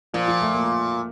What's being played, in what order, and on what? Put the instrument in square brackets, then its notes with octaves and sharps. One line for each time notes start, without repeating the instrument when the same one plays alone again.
[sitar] A#2 [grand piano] F3
[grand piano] F3
A3
A#3